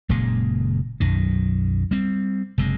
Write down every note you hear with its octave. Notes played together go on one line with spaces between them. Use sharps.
F#1 A#2 C#3 G#3
B1 F#2 D#3
G3 C4
F#1 C3 G#3